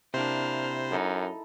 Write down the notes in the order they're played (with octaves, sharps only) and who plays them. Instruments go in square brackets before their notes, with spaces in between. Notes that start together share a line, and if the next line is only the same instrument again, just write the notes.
[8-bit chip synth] C3 C5 [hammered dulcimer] A#3 E4 [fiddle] D4 F6
[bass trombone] F#2 [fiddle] D#4 [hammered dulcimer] A4